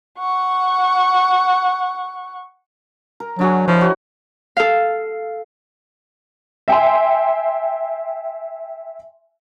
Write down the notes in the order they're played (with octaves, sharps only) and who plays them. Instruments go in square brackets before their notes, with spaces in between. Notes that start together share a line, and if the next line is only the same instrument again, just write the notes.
[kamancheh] F#5 C#6
[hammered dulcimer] A#4
[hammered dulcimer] D3 F#4 G#4 [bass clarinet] F#3
[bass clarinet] F3 [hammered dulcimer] E4 C#5
[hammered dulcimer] F#4 D#5
[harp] A4 F5
[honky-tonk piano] E5 G5 G#5 C6